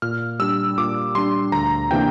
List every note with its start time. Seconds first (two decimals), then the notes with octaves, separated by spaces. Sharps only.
0.02 A#2 F6
0.39 G3 D4 E6
0.78 A#2 D6
1.15 G3 D4 C6
1.52 D2 A#5
1.91 C3 E3 A#3 D4 G5